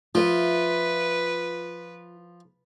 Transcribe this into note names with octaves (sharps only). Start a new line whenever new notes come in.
F3 F4 B4 E5